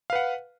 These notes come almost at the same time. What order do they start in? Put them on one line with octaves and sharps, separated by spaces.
F5 B4 F#5